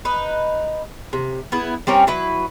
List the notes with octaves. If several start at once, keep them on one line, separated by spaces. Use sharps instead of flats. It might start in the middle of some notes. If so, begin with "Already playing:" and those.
D#4 B4
C3
B3 E4 G#4
G3 C4 C#4 A#4
F#3 E4 B4